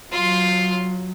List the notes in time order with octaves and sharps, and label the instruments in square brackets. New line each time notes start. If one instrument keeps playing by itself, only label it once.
[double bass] F#3 [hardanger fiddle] F4 C6